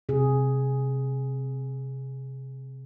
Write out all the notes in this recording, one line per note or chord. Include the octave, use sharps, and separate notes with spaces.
C3 G#4